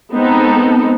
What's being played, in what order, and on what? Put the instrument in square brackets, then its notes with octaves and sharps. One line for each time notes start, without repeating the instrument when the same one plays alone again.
[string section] G#3 B3 C4 D#4 A4